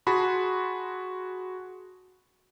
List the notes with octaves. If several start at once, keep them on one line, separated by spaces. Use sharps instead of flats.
F#4 G#4 A5 B5 C6